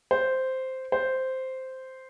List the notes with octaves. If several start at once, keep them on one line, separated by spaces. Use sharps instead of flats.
C5
C5